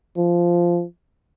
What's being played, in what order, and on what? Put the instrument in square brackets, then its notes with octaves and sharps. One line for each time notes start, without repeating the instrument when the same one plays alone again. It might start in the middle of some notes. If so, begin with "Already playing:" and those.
[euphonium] F3